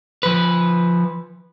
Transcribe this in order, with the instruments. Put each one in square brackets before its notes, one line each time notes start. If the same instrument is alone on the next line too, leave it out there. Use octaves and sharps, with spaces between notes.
[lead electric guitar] F3 B4